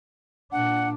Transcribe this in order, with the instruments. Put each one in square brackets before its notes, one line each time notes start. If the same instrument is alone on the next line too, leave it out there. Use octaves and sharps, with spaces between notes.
[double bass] A#2 D4 [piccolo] F#5